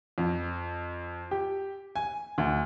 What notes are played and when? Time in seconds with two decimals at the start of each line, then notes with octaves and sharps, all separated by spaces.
0.18 F2
1.31 G4
1.96 G#5
2.38 D2